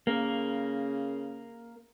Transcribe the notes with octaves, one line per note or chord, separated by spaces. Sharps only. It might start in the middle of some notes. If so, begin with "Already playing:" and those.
C#3 A#3